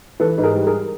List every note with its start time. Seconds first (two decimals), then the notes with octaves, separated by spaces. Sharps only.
0.20 E3 A4 B4
0.38 G#2 B4
0.43 G#4 A#4
0.55 G3
0.67 G#4 A#4